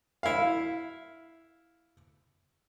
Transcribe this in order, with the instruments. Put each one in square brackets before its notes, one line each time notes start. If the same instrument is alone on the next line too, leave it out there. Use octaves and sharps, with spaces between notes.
[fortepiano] E4 F5